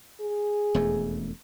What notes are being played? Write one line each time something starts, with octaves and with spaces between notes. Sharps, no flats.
G#4
E1 F2 A3